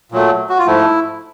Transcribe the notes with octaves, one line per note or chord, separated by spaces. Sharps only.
A#2 F#3 A3
F#4
F4
G#2 F3 A3 E4